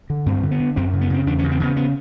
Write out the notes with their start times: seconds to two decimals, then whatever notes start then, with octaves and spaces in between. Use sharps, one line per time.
0.10 D3
0.26 G2 C4
0.43 D3
0.51 B3
0.60 D3
0.76 F#2 C4
0.93 C#3
1.01 B3
1.10 C#3 C4
1.26 E2 D4
1.39 C#4
1.43 C#3
1.51 C4
1.60 C#3 B3
1.76 B3